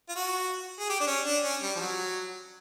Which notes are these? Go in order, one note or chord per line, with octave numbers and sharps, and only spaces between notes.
F4
F#4
G#4
G4
D4
C#4
D4
C#4
G3
F3
F#3